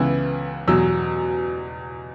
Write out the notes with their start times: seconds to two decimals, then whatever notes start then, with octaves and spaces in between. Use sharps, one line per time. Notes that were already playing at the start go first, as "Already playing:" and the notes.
Already playing: C#2 C#3 E3 B3 E4
0.68 E2 B2 F#3 E6